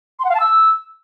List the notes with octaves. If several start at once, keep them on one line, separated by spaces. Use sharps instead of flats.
C6
F#5
F5
A5
E6